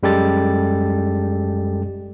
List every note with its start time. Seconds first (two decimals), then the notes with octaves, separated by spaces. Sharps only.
0.03 F#2 G3 G#3 G4 A4 A6